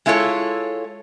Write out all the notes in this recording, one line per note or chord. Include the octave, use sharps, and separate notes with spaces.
G#3 E4 F4 A4 C#5